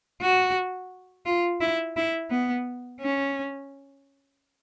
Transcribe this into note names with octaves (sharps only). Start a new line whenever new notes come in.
F#4
F4
E4
E4
B3
C#4